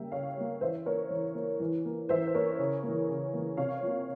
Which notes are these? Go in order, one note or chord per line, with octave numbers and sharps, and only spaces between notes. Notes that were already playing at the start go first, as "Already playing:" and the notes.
Already playing: C#3 G3 A#3 E5 G5
C#3 C#5 F5
G3 A#3
E3 C5 E5
A#3 A#4 C#5
E3
A#3
E3
A#3
E3 C5 E5
C5
A#3 A#4 C#5
C#3
A#3
E3
C#3
E3 A#3
C3 C#5 F5
F3 A#3